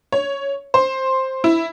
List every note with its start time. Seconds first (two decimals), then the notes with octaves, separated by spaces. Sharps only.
0.12 C#5
0.74 C5
1.44 E4